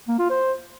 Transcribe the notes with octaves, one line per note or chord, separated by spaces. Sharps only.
A#3
F4
C5